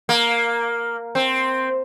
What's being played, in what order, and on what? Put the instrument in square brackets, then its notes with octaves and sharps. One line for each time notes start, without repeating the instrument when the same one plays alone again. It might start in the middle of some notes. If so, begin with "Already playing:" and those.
[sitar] A#3
C4